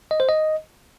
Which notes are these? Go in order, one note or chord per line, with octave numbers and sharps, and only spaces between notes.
D#5
C5
D#5